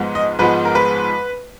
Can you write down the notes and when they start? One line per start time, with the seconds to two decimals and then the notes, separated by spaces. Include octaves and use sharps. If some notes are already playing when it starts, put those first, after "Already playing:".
Already playing: G#2 F3 G#3 B3
0.15 D#5
0.39 G#2 F3 G#3 B3 B4
0.65 A#4
0.75 B4